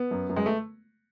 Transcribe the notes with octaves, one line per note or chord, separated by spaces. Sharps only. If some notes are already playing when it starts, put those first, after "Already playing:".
Already playing: B3
F#2
F#2
G#3
A3